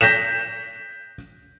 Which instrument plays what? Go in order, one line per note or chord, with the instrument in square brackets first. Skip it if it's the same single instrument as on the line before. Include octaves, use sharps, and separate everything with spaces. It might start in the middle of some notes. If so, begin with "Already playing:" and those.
[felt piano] G6 A#6 B6 E7